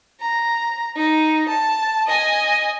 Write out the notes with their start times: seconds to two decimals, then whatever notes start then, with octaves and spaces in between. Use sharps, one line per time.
0.21 A#5
0.96 D#4
1.49 A5
2.07 D#5 G#5